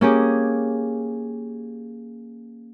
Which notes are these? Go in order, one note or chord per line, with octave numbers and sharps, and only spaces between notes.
A#3 C#4 G4 G#4